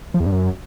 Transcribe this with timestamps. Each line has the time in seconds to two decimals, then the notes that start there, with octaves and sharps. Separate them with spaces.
0.14 F3
0.20 E2
0.26 G2
0.32 F#2